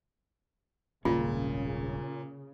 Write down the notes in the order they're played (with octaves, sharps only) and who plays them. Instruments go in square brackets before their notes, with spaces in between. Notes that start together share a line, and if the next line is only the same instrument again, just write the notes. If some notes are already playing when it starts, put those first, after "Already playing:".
[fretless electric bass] D#1 G#1 C#4 [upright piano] A#2 [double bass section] C#3 [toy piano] F4